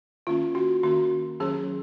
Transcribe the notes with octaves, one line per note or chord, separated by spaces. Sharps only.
D#3 A#3 C#4 F4
F#4
D#3 A#3 C#4 F#4
D#3 F#3 C#4 G#4